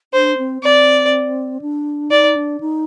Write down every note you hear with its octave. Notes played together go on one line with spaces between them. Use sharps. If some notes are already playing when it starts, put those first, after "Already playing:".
D4 C5
C4
C4 D5
D4
D#4 D5
D4
D#4